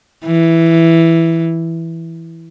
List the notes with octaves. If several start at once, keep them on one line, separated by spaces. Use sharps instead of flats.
E3